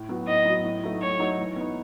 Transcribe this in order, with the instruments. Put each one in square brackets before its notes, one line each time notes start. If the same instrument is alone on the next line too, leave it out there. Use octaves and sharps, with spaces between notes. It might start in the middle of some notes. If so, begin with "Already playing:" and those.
Already playing: [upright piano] A2
F#3 B3 F#4
[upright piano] A2 [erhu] D#5
[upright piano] F#3 B3 F#4
A2
F#3 A3 D#4 F#4
[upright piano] A2 [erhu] C#5
[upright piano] F#3 A3 D#4 F#4
E3
B3 D#4